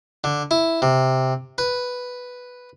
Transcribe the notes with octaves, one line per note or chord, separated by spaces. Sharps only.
D3
E4
C3
B4